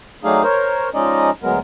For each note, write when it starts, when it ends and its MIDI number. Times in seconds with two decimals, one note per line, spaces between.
0.24 0.42 54
0.24 0.42 57
0.24 0.42 62
0.24 0.42 63
0.24 0.42 68
0.24 0.42 77
0.43 0.89 70
0.43 0.89 72
0.43 0.89 73
0.94 1.30 53
0.94 1.30 56
0.94 1.30 61
0.94 1.30 63
0.94 1.30 74
0.94 1.30 75
1.43 1.59 38
1.43 1.59 54
1.43 1.59 56
1.43 1.59 59
1.43 1.59 70